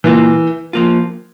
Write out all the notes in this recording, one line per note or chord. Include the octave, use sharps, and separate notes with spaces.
A#2 E3 G3 A#3 F4
F3 A#3 F4